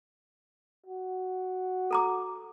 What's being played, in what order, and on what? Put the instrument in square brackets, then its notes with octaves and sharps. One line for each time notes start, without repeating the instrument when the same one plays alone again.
[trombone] F#4
[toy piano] A4 A#5 D6